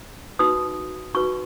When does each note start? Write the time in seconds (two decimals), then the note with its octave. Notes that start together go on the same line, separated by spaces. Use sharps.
0.39 D#4 F#4 B4 D#6
1.14 D#4 F#4 B4 C#6